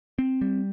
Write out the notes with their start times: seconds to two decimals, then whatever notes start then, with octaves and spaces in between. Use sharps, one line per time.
0.19 C4
0.41 G3